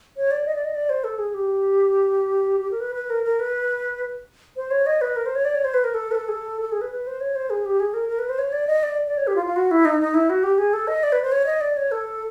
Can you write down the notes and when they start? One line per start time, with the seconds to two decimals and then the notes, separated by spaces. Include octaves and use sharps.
0.17 C#5
0.31 D5
0.46 D#5
0.55 D5
0.65 D#5
0.75 D5
0.90 C5
1.04 A4
1.19 G#4
1.34 G4
2.60 G4
2.71 A#4
2.80 B4
2.95 B4
3.10 A#4
3.24 A#4
3.40 B4
4.56 C5
4.71 C#5
4.86 D#5
5.01 B4
5.16 A#4
5.26 C5
5.35 C#5
5.45 D5
5.55 C#5
5.65 C5
5.74 B4
5.84 A#4
5.94 A4
6.11 B4
6.15 A4
6.28 G#4
6.32 A4
6.62 A4
6.72 G#4
6.81 B4
6.92 B4
7.07 C5
7.21 C#5
7.36 C5
7.50 G#4
7.65 G4
7.80 G#4
7.94 A#4
8.09 A#4
8.19 B4
8.29 C5
8.39 C#5
8.53 D5
8.67 D#5
8.83 D5
9.07 D5
9.17 C#5
9.27 G4
9.36 F4
9.46 F4
9.56 F#4
9.71 E4
9.85 D#4
10.01 D#4
10.14 E4
10.30 F#4
10.43 G4
10.58 G#4
10.73 A4
10.88 D#5
11.03 D5
11.12 B4
11.22 C5
11.32 C#5
11.46 D#5
11.61 D5
11.77 C#5
11.92 A4